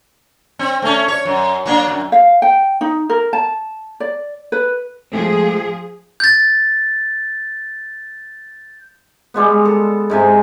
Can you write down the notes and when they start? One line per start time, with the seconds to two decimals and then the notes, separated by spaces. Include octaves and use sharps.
0.59 C4
0.82 A3 C#4
1.08 C#5
1.25 F#2
1.66 F#3 A#3 D4
1.88 F#2
2.12 F5
2.42 G5
2.81 D#4
3.10 A#4
3.33 A5
4.00 D5
4.52 B4
5.12 F3 G#3 A3 C4 G#4
6.20 G6 A6
9.34 G3 G#3 B3
9.65 A4
10.10 G#2 C3 G#5